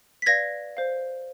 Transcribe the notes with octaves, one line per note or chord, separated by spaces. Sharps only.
B6
B4 D5 F5 G#6 A#6
C5 F5